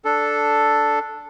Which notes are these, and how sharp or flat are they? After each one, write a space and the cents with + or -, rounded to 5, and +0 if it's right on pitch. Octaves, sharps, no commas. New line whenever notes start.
D4 +0 A4 +0